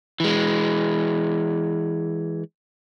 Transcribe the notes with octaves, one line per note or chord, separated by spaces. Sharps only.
E3 G#3